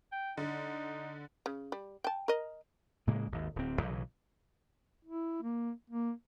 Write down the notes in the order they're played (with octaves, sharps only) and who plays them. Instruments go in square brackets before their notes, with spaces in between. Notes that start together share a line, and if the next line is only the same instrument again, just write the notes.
[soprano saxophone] G5
[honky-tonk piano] D3 [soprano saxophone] D#4
[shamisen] C#3
G3
G5 A5
A#4 D#5
[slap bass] A2 C#3 G#3 A#3
G#1 D#2
D1 C4
B1 C#3 E3 F#3
[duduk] E4
A#3
A#3